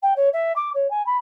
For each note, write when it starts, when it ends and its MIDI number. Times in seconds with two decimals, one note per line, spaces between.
0.02 0.13 79
0.16 0.29 73
0.33 0.54 76
0.56 0.70 86
0.74 0.89 73
0.90 1.04 80
1.06 1.17 83